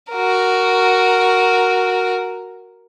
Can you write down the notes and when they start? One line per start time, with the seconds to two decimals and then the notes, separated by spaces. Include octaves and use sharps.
0.12 F#4 A#4